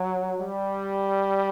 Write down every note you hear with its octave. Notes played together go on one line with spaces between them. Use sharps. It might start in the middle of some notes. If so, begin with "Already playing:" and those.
Already playing: F#3
G3